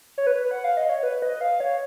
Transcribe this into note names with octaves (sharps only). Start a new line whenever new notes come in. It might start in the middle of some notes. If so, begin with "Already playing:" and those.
C#5
B4
F#5
F5
D#5
C#5
B4
D#5
F5
C#5